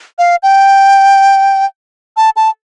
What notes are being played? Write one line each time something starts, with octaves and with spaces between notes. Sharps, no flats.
F5
G5
A5
A5